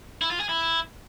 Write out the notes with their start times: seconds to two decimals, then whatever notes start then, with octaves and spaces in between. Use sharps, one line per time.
0.22 E4
0.31 F4
0.40 G#4
0.49 E4